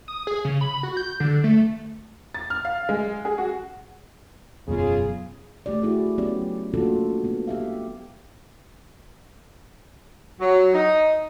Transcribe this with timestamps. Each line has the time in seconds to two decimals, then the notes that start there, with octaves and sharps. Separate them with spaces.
0.08 D#6
0.27 G#4
0.45 C#3
0.61 B5
0.83 F#4
0.97 G6
1.20 D3
1.44 A3
2.34 A6
2.50 F6
2.65 F5
2.89 G#3
3.25 G#4
3.38 F#4
4.68 E1 F#2 C#3 B3 F4 G#4
5.66 A3 G4 D5
5.82 E4 F#4 G#4
6.18 F#3 B3 C#4 G4 D5
6.74 A3 A#3 D4 F4 F#4 A4
7.24 G#3 B3
7.48 A#3 G4 E5 F5
10.41 F#3
10.74 D#4